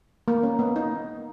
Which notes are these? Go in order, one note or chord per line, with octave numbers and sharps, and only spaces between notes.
A#3
C#4
B3
D#4